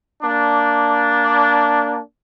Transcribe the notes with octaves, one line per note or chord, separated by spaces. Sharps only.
A#3 D4